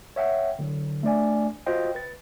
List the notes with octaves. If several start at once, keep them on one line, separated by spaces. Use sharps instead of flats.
C#5 E5 F#5 G5
D3 F#3
A3 D4 D5 G#5
F4 F#4 C5 D#5 G5
B4 A6